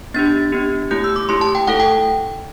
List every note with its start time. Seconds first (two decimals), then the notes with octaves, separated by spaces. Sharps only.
0.14 B3 D4 G4 A6
0.52 B3 D4 G4
0.91 A3 E4 G4 G6
1.04 E6
1.16 D6
1.29 A3 E4 G4 C6
1.41 A5
1.55 G5
1.67 A3 E4 A4 F#5
1.80 G5